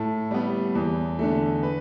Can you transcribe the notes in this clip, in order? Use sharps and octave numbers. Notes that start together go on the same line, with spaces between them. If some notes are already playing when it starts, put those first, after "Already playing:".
Already playing: A2 A4
G3 B3
E2
D3 A3
B4